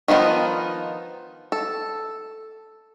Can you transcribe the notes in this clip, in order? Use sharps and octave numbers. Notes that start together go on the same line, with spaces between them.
D#3 F3 B3 D#4 F4
A4